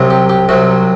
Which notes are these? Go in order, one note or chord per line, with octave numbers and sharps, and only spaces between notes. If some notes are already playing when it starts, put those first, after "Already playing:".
Already playing: C2 C3 F#3
G4
G4
C2 C3 F#3 F#4